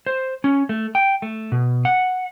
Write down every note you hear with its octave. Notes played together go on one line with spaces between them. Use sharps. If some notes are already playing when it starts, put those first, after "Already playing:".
C5
C#4
A3
G5
A3
B2
F#5